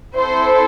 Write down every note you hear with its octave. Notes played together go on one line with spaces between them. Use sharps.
C4 E4 A4 C5